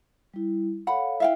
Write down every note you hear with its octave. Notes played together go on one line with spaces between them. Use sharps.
G3 E4
A4 C#5 F5 F#5 B5
E4 E5 F5 G5